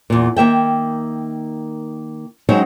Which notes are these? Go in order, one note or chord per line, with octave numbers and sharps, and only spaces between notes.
E2 A#2
D#3 A#3 E5 G5
F#3 G#3 C4 C#4 D#4